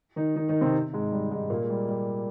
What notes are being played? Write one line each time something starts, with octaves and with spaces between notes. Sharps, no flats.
D#3 D#4
D#3 D#4
D#3 D#4
C3 C4
G#2 G#3
G3
G#2 G#3
A#2 A#3
G#3
G3
G3